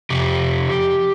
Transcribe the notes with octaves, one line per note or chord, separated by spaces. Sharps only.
F2 C3 G4